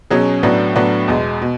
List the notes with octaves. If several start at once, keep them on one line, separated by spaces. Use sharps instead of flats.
B2 F#3 C#4 G#4
A2 F#3 B3 D4
A2 F#3 B3 D4
E2 B2 G#3
B2